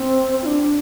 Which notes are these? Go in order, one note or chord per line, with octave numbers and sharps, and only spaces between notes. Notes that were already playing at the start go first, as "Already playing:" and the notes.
Already playing: C4
F4
D4